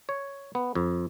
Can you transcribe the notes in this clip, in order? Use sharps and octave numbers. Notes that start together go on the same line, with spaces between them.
C#5
B3
F2